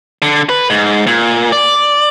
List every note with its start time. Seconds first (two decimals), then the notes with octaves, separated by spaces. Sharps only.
0.22 D3
0.49 B4
0.70 G#2
1.07 A#2
1.52 D5